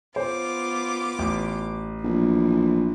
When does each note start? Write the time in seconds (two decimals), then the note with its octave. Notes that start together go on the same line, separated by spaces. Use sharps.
0.16 B3 F4 C5 D6
1.19 A1
2.04 A#1 E3